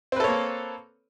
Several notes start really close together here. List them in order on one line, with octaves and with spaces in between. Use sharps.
C4 B4 A4 C#5 A#3